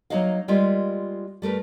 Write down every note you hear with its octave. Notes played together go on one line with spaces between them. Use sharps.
F#3 A#3 D#4 F#4 D#5 F5
G3 G#3 A#3 F4 G4
G3 A3 A#4 B4